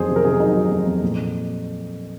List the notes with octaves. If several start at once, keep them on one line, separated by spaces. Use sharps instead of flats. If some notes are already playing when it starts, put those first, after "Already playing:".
Already playing: F2 D#3 F#3 G#4 C5
C3
A#4
C3 G#4
F#3 D#4
F#3
F2
F2
A#2